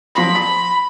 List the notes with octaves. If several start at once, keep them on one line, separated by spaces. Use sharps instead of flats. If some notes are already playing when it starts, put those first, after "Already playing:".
F3 B5 C6 A#6
B6